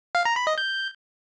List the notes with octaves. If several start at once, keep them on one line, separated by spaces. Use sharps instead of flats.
F5
A#5
B5
D#5
G6